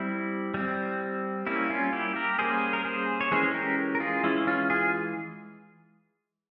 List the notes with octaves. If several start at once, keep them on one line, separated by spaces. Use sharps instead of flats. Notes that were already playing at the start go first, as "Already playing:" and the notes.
Already playing: G3 C4 E4
G3 C4
G3 A#3 C#4 E4
C#4 F4
E4 G4
G4 A#4
G3 A#3 C#4 G#4 C5
A#4
G#4 C5
C#5
E3 G#3 C#4 G#4 C5
G4 A#4
A#4
F4 G#4
E3 G#3 C#4 E4
C#4 F4
F4 G#4